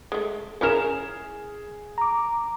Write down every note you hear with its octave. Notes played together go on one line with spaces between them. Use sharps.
G#3 A3
C#4 E4 G#4 A#4 F6 E7
A#5 D6